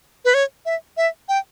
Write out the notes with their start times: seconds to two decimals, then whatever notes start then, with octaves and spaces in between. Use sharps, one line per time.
0.25 B4
0.34 C#5
0.66 E5
0.97 E5
1.29 G5